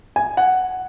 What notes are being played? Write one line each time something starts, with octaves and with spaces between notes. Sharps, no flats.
G#5
F#5